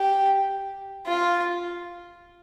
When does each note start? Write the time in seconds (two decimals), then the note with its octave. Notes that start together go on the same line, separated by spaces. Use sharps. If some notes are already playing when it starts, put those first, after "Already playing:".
Already playing: G4
1.08 F4